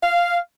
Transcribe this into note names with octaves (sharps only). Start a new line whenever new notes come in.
F5